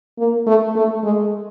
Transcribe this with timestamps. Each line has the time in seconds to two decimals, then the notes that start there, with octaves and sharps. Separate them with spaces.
0.18 A#3
0.47 A3
0.75 A3
1.03 G#3